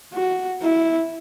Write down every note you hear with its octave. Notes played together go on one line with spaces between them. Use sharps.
F#4
E4